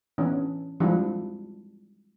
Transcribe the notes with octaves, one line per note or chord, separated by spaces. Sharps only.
E3 B3 C#4 D4
F3 G3 G#3 D4 E4